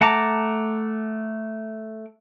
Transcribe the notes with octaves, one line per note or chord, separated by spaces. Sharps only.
A3 F#5 A5 A#5 D6